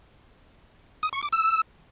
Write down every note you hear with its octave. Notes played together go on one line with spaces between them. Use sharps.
D#6
C#6
D6
E6